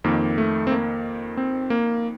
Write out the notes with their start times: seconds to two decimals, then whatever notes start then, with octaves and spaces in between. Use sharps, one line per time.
0.04 F2 D#3 A#3
0.38 A3
0.67 C4
0.71 A#3
1.37 C4
1.70 A#3